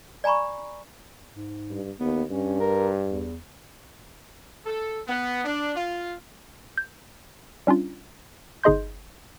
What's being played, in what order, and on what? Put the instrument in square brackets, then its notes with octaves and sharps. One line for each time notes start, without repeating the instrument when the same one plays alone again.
[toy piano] D5 G#5 A#5 B5 C#6
[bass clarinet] G#2
[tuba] G2
[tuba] D#2 [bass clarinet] B3
[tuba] G2 [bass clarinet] C#4
[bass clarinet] A#4
E2
[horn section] A4
B3
D4
F4
[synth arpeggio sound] G6
G3 C#4 D4 F4
G1 D#4 G#4 D#5 C6 G6